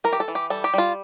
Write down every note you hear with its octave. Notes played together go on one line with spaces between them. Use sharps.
E3 A#4
G4
A4
E3
G4
G3 A4
G4
G3 F4